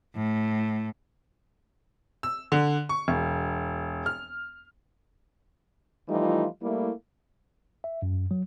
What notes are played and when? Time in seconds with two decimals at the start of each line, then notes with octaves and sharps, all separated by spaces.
0.15 A2
2.23 E6
2.52 D3
2.89 C#6
3.08 E1
4.06 F6
6.08 E3 F3 G3 A3 D#4 F4
6.62 G3 A3 A#3 E4
7.84 E5
8.02 F#2
8.31 F#3